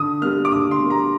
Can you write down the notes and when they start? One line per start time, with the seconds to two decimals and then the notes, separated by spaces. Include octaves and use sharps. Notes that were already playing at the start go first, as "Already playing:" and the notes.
Already playing: D3 D#6
0.22 G3 A#3 F6
0.45 D6
0.52 D3 D#6
0.71 C6
0.80 G3 A#3
0.90 A#5